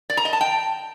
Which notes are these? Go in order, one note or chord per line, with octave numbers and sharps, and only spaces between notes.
D5
A#5
D#5
A5
G5